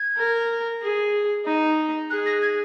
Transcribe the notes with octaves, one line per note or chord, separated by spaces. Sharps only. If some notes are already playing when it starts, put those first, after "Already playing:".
Already playing: G#6
A#4
G#4
D#4
G#4 F#6
A#6
G#6